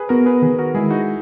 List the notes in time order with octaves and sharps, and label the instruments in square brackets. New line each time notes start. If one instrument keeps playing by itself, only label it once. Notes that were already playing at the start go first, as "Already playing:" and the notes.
Already playing: [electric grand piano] G#4 B4
[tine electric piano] B3 [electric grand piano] F#4 A#4
[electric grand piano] G#4 B4
[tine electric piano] D#3 [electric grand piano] G#4 B4
[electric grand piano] F#4 A#4
[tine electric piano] G#3 [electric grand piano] E4 G#4
[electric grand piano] D#4 F#4